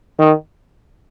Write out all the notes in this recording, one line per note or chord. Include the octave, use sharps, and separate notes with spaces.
D#3